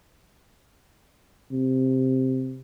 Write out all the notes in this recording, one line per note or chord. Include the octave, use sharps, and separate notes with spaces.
C3